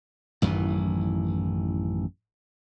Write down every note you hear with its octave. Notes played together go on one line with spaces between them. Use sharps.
A1 F#2 D#3 E3